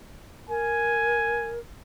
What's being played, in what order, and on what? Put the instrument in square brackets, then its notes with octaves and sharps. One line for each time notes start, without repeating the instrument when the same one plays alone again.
[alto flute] A#4 [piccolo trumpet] G#5